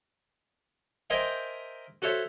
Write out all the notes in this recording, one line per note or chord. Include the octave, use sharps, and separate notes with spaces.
A#4 C5 D#5 E5 G5 G#5
F#4 A4 C5 C#5 E5